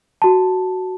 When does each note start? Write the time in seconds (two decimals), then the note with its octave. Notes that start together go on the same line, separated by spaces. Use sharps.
0.22 F#4 A5